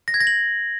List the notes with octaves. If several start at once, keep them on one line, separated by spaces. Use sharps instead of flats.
A#6
G#6
A#6
F#7